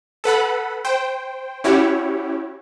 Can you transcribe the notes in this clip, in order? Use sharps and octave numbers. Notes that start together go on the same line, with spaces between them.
A4 B4 F#5 B5
C5 G5
C#4 E4 F#4 G4 C#5